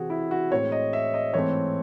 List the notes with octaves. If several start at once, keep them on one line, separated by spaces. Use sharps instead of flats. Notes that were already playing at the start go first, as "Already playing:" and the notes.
Already playing: C3 E3 C4 F#4 G#4
E4
F#4
A2 G#3 C4 C#5
D#5
E5
D#5
G#2 E3 A3 C4 C#5